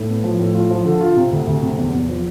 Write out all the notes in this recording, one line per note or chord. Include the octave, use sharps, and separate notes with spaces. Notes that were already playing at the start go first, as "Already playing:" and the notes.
Already playing: A2
B3
F3
A2
F4
F3
D3
F4
C3
D2
D2
C3
E2
E2
F3